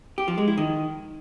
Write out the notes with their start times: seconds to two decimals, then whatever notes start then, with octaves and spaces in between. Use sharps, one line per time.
0.18 G4
0.28 F3
0.38 G#3
0.48 E4
0.57 D#3